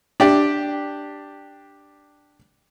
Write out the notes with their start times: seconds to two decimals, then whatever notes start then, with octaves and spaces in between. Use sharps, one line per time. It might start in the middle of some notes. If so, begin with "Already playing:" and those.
0.20 D4 G4 D5